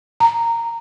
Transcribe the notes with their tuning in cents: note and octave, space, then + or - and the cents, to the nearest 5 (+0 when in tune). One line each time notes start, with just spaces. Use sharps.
A#5 -10